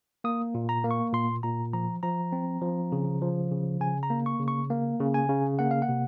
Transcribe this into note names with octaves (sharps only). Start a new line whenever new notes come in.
A#3 D#6
A#2
A#5
A#3
C#6
A#2 C6
A#2 A#5
F3 A#5
F3 A#5
C4
F3
C#3
F3
C#3
C#3 G#5
A#5
A#3
C#6
C#3
C#6
A#3
C#3
G#5
C#3
A#3 F#5
F5
F#5
C3